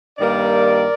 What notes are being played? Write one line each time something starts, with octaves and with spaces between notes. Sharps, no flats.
G2 D#3 G3 A#3 A#4 D5